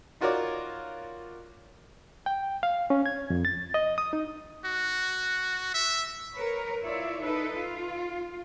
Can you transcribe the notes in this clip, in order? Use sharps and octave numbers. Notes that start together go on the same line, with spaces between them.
D#4 F4 F#4 A#4 C#5 D5
G5
F5
C#4
G#6
F2
A6
D#5
D#6
D#4
F#4
E5
A#4 B4 C#5
E4 F4 C#5 D5 E5
D#4 E4 A4 B4
F4